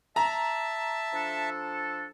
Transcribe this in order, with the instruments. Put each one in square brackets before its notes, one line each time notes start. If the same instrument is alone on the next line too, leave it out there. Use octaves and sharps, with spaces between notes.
[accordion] E5 A5 [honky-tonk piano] A#5
[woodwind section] F3 D4 A4